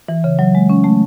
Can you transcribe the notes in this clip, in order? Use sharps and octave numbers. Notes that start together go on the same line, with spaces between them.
E3
C#3
F#3
G#3
C#4
A3